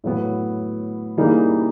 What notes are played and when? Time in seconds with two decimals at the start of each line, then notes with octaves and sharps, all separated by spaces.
0.04 A2 F#3 B3
1.17 C#3 E3 G3 A#3 D#4